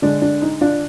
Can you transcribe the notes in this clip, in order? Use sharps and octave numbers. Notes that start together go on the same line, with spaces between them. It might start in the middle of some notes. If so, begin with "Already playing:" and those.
D3 G#3 D4
D4
D#4
D4 F4